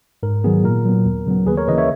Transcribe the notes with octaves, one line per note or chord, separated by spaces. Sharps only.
G#2 A#4
D#3 F#3 B3 G#4
A#2 A#4
F#3 B3
D#2
C#3 F#3 B3
D#2 G#4 B4
A#4 C#5
C#3 E3 A#3 B4 D#5
C#5 E5